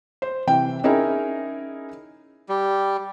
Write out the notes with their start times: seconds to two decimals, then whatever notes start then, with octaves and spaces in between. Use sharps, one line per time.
0.22 C5
0.47 C3 E3 G5
0.84 C#4 D#4 E4 G#4 A#4
2.49 G3